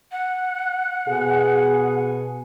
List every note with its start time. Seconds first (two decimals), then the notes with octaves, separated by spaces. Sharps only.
0.12 F#5
1.07 B2 G#4